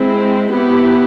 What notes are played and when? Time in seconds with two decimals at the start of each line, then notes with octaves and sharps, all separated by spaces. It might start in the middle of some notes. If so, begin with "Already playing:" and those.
Already playing: G#3 C4 E4
0.51 B3 E4 G4